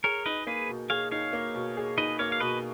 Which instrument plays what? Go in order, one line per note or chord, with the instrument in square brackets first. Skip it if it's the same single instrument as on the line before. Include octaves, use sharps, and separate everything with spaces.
[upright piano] G#4 [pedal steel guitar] A#4 C#5
[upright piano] D#4 [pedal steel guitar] B4 D#5
[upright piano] A#3 [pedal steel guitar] G#4 B4
[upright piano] B2
[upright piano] G#4 [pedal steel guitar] C#5 F5
[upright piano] D#4 [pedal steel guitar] C#5 F5
[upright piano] A#3
B2
G#4
[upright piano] D#4 [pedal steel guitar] B4 D#5
[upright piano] A#3 [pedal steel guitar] C#5 F5
[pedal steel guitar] F5
[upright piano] B2 [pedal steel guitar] B4 D#5